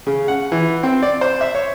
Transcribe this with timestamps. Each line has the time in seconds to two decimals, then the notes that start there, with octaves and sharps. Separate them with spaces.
0.07 C#3
0.28 F#5
0.52 E3
0.83 C4
1.02 D5
1.21 C5
1.41 E5
1.55 C#5